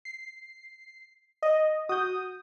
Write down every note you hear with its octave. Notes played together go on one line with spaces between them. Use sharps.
C7
D#5
F#4 D#6 G6